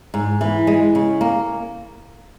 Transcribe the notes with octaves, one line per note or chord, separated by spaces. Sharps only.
G#2
E3
G#3
C#3
A#3